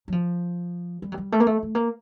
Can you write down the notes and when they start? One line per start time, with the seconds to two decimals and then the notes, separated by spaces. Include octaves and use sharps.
0.08 F#3
0.12 F3
1.02 G3
1.12 F#3
1.18 G3
1.32 A3
1.40 A#3
1.47 A3
1.63 A3
1.75 A#3